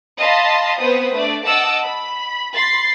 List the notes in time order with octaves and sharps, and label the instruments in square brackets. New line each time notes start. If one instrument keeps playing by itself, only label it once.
[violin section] D#5 F5 A5 B5 C6
B3 C4 B4 C5 D#6
A3 D4 D5
D#5 F#5 A5 D6 E6
B5
B5 C6 A6 B6 C7